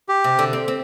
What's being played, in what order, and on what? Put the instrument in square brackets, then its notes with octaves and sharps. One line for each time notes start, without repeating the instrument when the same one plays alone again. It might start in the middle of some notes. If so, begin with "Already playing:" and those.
[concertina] G4
[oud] C3
D3
C4
C4